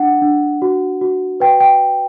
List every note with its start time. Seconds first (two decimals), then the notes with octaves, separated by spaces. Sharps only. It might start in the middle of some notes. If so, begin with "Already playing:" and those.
Already playing: D4 F#5
0.22 D4
0.62 F#4
1.01 F#4
1.40 B4 G5
1.60 G5